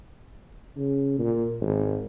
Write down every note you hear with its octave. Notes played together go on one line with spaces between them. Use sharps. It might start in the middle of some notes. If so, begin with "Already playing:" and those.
C#3
A#2
G#1